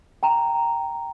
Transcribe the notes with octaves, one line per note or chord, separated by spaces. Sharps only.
G5 A#5